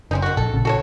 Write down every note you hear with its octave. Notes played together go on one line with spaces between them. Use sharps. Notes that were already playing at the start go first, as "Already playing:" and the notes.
F#1 C4 C#4 D#4
D#3 F#4
A#1 A4
A#1 C#3
F#4 A4 C#5